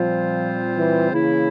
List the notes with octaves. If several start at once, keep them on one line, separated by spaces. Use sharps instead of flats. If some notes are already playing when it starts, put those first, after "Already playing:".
Already playing: A#2 F3 G3 C4 F4 C5
E3
C#3 E3 A#3 E4